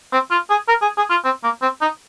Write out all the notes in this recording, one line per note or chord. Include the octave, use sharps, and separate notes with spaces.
C4
F4
G#4
A#4
G#4
G#4
F4
C4
A#3
C4
D#4